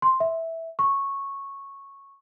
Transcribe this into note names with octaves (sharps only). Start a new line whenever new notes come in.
C6
E5
C#6